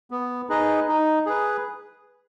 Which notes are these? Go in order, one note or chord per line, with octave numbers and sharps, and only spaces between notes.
B3
D#4 G#4 B4 D#5
D#4
G#4 B4